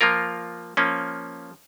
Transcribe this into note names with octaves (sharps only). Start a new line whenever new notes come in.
F3 A#3 F4 A#4
F3 A#3 C#4